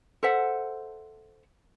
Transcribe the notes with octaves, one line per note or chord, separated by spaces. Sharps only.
A4 C5 E5 F#5